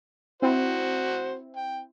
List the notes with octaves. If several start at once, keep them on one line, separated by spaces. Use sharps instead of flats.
C4 E4 F#4 C5
G5